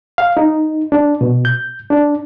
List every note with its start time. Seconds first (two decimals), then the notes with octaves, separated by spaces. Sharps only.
0.18 F5
0.37 D#4
0.92 D4
1.21 B2
1.45 G6
1.90 D4